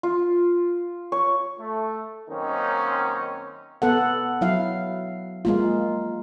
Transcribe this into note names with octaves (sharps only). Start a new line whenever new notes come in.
F4
C#5
A3
F#2 D#3 A#3 C4 C#4 D#4
B3 A4 F#5
F#3 E4 F5
G#3 A#3 F4